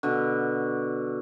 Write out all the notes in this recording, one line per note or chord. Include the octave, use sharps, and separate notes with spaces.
B2 D3